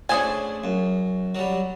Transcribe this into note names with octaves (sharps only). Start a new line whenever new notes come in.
A3 C#4 D4 G#4 C5 G#5
F#2
F#3 G3